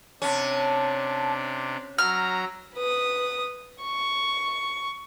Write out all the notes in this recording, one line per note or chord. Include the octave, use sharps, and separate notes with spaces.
C3 C#4 D4 A5
F#3 A#5 E6 F6
B4 D#6
C#6